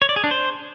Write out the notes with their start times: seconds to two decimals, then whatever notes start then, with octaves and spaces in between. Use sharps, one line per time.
0.02 C#5
0.09 D5
0.16 G#4
0.24 D4
0.31 C5